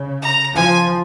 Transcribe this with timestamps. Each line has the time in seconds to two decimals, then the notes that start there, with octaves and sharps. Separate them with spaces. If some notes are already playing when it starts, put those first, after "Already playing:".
Already playing: C#3
0.22 A#5
0.55 F3 G#5